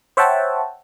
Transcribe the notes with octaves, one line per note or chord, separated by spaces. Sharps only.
C5 C#5 E5 F#5 G5 A5